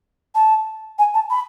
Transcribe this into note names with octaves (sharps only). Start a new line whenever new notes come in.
A5
G#5
A5
B5